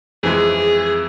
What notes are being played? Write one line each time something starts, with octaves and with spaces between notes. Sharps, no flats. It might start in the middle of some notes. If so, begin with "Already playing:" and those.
F2 E3 G#3 G#4